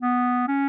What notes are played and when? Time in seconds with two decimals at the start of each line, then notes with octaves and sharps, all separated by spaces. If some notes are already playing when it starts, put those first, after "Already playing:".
0.02 B3
0.48 C#4